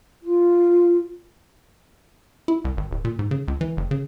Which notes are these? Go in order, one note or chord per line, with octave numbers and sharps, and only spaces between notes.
F4
E4
C2
G#1
D1
A#2
G#2
C#3
C#2
E3
F#1
C#3